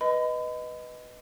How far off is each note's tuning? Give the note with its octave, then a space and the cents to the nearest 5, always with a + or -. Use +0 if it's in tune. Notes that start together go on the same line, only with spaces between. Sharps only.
B4 +0 D#5 +0 B5 +35